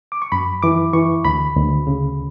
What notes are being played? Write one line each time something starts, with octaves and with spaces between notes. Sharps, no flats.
D6
C#6
F#2 B5
E3 D6
E3 C#6
D2 B5
D2
C#3